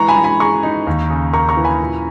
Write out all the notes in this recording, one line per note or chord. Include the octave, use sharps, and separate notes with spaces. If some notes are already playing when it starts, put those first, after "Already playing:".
Already playing: E3 G#3 A#5 C#6
G#5 B5
G#3
G#5 B5
G#4 A#5 C#6
D#4
D#2
C#3
A#3 A#5 C#6
A#5 C#6
E3
G#5 B5
A#2